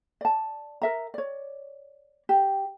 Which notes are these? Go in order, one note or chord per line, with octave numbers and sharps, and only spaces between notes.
D5 A5
A#4 E5 A#5
C#5 D5
G4